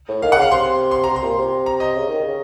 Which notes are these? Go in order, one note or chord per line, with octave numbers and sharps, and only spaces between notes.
A2
D#3 F5
F#5
C#3 F5
C3 C6
C6
C3 A#5
C6
A#2
C3
A#5
D#5
C#3
D#3
C#3